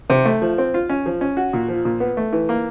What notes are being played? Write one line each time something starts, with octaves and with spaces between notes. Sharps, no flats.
C3
A3
F3
C4
F4
C#4
F3
C#4
F#4
A#2
F3
A#2
B3
A3
E3
A#3